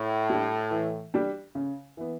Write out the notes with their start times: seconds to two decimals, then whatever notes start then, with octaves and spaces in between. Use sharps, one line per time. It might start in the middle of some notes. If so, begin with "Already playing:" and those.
Already playing: A2
0.30 G3 D4
0.71 E3
1.14 G3 D4
1.55 C#3
1.97 E3 B3